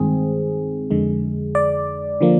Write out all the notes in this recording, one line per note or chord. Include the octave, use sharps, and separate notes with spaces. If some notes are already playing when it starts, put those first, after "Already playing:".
Already playing: G2 D#3 G#3 C4 G#4
F2 D3 G#3
D5
D3 F3 A#3